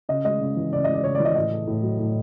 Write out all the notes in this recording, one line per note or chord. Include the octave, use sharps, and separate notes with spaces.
C#3 D#5
G#3 D#5
C#3
E3
C#3 D5
G#3 D#5
D5
C#3 C#5
D5
E3
D#5
A2 D#5
A3
A2
F#3
A2